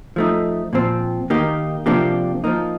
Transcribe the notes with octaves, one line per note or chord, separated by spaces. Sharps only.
F3 A3 D#4
A#2 F3 C4
D#3 A#3 D#4 G4
C3 F3 A#3 D4 G4
F3 A#3 D#4